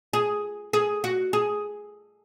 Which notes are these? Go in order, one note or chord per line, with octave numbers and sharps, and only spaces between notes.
G#4
G#4
F#4
G#4